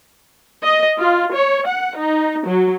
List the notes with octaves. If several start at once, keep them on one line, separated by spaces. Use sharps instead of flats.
D#5
F4
C#5
F#5
D#4
F#3